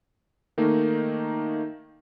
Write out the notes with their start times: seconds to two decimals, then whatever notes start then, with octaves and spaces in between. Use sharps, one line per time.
0.58 D#3 A3 A#3 D#4